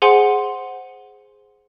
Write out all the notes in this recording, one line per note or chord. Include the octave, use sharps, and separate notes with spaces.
G#4 C5 F#5 G#5 C6